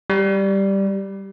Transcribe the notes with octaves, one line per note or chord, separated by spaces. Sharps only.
G3